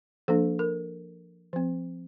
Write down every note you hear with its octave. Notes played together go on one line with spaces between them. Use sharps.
F3 A#3 D4 A4
A#4
F3 C4